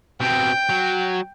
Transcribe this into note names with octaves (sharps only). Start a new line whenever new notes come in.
B2 C4 G5
F#3